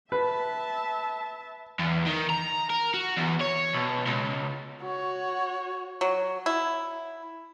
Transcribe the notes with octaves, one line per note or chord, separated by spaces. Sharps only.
B4 E5 A5
E2
D#3
A#5
A#4
F#4
E2
C#5
B1
C#2
F#4 C#5
F#3
E4